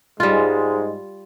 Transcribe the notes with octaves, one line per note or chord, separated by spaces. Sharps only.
G#2 G3 G#3 F4